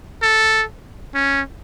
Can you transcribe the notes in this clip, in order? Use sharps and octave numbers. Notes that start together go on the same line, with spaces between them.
A4
C#4